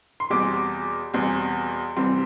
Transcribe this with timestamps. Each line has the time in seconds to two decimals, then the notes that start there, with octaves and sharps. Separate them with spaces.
0.20 C6
0.30 E2 B2 G3 C4 D6
1.14 E2 B2 G3 C4
1.96 C2 C3 E3 G3 C4